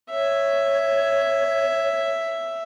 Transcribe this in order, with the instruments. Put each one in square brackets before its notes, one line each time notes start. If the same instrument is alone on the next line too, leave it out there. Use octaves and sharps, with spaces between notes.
[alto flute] C#5 [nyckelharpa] E5